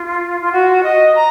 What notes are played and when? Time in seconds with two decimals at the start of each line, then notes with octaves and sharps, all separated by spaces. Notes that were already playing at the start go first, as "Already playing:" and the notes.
Already playing: F4
0.41 F4
0.52 F#4
0.83 D#5
1.15 A#5